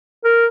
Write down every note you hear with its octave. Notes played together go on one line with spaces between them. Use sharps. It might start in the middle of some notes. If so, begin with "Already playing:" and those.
A#4